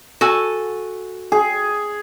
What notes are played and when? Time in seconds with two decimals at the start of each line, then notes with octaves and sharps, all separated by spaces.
0.21 F#4 A4 G#5
1.32 G#4